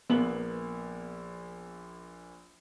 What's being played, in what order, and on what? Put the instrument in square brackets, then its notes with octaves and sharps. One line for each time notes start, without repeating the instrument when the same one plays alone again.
[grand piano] A#1 A#3 F#7 [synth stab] B3